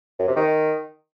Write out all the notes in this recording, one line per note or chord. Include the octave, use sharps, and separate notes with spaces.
F#2
C3
D#3